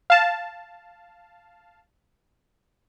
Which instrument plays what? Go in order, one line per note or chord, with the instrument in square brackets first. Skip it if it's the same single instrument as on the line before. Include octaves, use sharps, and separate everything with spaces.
[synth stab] F5 A5